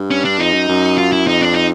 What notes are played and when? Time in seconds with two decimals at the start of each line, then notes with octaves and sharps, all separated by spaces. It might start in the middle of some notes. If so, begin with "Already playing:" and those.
Already playing: G2
0.11 C#4
0.25 D4
0.39 F2 D#4
0.54 F#2
0.69 F#2
0.98 F4
1.12 E4
1.27 F2 D#4
1.42 D4
1.54 D#4